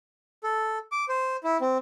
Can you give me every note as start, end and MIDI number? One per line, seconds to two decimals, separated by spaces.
0.44 0.78 69
0.92 1.05 86
1.08 1.36 72
1.44 1.58 64
1.61 1.78 60